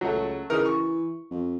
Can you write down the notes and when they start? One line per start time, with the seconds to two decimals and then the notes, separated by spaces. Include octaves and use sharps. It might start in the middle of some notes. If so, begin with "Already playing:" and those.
0.01 C#2 F#3 A3
0.50 C#3 E3 D#4 A#4
0.65 C#6
1.31 F2